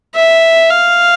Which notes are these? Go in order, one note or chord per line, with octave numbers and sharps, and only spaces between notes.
E5
F5